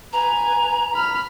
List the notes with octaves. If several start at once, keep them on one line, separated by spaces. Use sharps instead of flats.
B4 G#5 A#5
B5 F6